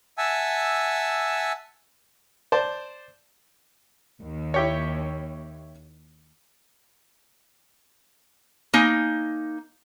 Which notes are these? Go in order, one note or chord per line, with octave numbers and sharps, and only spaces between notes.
E5 F#5 G#5 A5 E6
C5 D5 A5
D#2
E4 G4 C#5
A#3 D#4 G#5